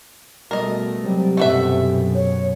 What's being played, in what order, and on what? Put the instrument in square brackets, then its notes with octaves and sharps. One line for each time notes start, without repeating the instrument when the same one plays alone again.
[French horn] B2 [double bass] G3 A3 [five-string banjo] A#4 D#5
[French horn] C3 [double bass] F#3 G3
[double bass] F#2 B2 [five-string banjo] A3 F#4 E5
[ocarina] C#5